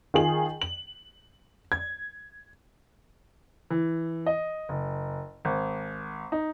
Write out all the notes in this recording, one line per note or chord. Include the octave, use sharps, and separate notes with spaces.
D#3 F4 G#4 F#7
F#7
G#6
E3
D#5
F#1
G#1
D#4